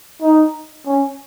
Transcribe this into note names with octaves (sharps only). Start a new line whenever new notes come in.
D#4
C#4